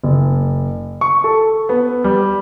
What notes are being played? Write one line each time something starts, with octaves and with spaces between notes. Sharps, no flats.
F#1
C#6
A4
B3
G3